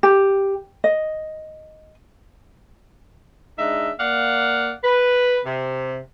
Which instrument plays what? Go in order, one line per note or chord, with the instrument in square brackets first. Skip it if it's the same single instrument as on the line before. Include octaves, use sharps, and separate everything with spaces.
[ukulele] G4
D#5
[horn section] G#3 D4 D#4 E5
A#3 D5 F5 F#5
B4
C3